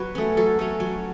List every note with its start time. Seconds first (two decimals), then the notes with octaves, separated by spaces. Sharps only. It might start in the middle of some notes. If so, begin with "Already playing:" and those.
Already playing: F#3 B4 C#5 F#5
0.15 A3 C#4
0.37 F#3 A4
0.59 A3 C#4
0.80 F#3